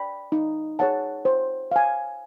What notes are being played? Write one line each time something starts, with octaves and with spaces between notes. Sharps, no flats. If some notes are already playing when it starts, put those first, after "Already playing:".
Already playing: D5 G5 B5
D#4
G#4 C#5 F#5 A5
C5
F5 G#5